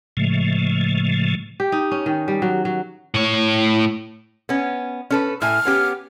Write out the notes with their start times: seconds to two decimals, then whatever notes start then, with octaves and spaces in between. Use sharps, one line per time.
0.17 A2 C#3 F3 G#3 A3
1.60 G4
1.72 D#4
1.91 C#4
2.06 D#3
2.28 G3
2.42 F#3
2.65 F#3
3.14 A2 C#5
4.49 B3 C#4
5.10 C#4 A4 B4
5.42 A2 E5 G#5 F6
5.65 B3 C#4 G4